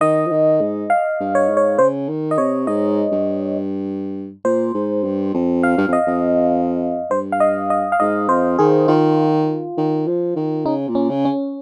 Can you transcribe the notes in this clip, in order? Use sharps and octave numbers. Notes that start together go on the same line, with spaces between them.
D#3 D#5
F3
D#3
G#2
F5
G2
C#5
G#2
C#5
C#3 C5
D#3
D#5
C3 C#5
G#2 D#5
G2
A#2 C5
G#2
G2
F2
F5
G2
F2
D#5
F2
G2 C5
F5
D#5
D#5
F5
G#2 D#5
F2 C5
D#3 G#4
D#3 F4
D#3
F3
D#3
C#3 D#4
A#2
C#4
C#3
C#4